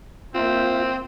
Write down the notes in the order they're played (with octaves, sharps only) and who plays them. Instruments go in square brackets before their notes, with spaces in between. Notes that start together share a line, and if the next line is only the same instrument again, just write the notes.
[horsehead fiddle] A#3 E5 [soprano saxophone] C4 [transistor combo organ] F4 [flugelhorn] C5